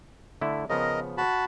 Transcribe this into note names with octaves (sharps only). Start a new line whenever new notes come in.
D3 A3 E4
C#3 F3 B3 A#4 D#5
F#4 A5 B5